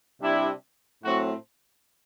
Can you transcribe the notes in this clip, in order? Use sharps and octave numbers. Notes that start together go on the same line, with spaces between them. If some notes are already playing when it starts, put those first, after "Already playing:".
C3 G3 D4 E4
A2 F#3 A3 C4 F#4